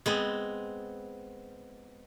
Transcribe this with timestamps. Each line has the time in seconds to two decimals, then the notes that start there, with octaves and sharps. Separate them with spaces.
0.06 G#3 B3 C4